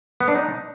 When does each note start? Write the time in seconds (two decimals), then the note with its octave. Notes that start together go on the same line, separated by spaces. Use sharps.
0.20 B3
0.28 D4
0.35 D#4